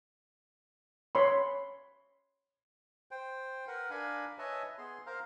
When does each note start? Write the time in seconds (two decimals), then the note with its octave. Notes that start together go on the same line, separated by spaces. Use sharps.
1.15 C#5 B5 C6
3.11 C5 G5
3.68 A#4 B4 F#5
3.91 D4 A#4 F5 G#5 B5
4.39 B4 C#5 D#5 E5 G#5 A5
4.78 B3 G#4 C6
5.06 A#4 C5 F5 A#5